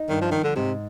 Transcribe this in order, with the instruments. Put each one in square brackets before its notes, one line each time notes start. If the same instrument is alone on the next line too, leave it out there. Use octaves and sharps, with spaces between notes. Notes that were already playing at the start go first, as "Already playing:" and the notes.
Already playing: [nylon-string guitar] D#4
[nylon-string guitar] G2 [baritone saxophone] D#3
[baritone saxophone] F3
[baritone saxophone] D#3 [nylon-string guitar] F3
[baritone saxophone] D3
[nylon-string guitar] G#2 [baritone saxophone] C3